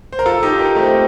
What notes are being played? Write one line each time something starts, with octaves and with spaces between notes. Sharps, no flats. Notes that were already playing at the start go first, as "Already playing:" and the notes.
C5
A#4
F4 A4
D#4 G4
G4 A#4
A3 C4